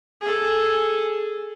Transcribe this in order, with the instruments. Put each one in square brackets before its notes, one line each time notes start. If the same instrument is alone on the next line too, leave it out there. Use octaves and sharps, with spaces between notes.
[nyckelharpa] G#4 A4